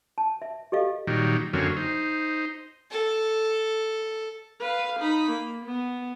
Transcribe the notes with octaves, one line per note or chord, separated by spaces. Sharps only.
A5
E5
G4 A4 D#5 F5
A#2 D#3 F#3 G3
F#2 D3 F#3 A#3 C4 C#4
D#4 C5
A4
B4 F5
D#4 B5
A#3
B3